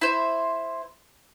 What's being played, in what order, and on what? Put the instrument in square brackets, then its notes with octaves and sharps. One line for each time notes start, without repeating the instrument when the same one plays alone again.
[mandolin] E4 C5